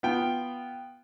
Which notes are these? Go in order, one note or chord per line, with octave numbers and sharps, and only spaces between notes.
B3 F4 G5